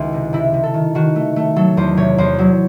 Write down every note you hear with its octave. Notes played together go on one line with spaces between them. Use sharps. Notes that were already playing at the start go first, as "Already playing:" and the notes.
Already playing: C#2 D#3 E4 F#4
C3
C3 E4
C3
A4
D#3
D#3 F#4
A3
A3
F#3 A4
E2 C5
C3 C#5
E2 C5
F#3